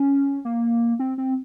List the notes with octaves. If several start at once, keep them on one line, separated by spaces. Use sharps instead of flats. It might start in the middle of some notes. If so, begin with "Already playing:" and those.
Already playing: C#4
A#3
C4
C4